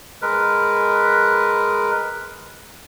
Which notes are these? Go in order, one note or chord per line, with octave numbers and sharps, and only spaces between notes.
G#3 A#4 B4